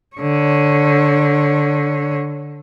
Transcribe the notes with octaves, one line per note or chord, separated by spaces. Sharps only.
D3 C#5